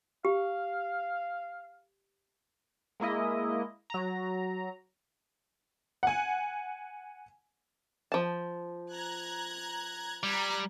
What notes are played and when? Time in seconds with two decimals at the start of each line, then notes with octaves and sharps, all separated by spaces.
0.25 G4 F5
3.00 G#3 A#3 E4 D#5
3.90 F#3 A#5
6.03 F#5 G#5
8.12 F3 A5
8.93 A#5 F#6 G#6
10.23 G3 A#5 F#6 G#6